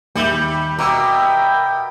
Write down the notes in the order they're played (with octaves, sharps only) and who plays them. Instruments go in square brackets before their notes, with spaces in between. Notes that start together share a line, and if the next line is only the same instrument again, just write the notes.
[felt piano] D#2 E5 G6 [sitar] G3
[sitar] B2 [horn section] A#4 E5 G5 [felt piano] A#5 D6 E6